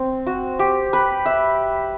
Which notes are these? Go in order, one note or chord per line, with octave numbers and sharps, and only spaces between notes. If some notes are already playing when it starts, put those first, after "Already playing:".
Already playing: C4
F#4
G4
B4
E5